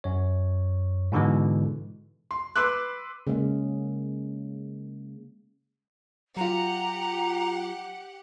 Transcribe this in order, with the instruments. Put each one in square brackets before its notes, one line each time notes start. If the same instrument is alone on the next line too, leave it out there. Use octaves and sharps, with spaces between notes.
[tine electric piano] F#2 C#5
G#2 B2 D3 E3 G#3
[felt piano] C6
B4 C6 D6 E6 F#6
[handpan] C#3 G#3 A#3
[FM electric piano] F#3 F4 [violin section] G4 F#5 [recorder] A#5